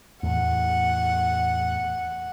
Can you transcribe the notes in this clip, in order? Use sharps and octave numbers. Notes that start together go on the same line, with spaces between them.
E2 A2 F#5